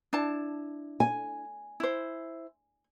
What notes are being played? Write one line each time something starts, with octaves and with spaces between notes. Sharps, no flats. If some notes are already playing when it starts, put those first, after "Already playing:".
D4 E4 A5
G#5
E4 C5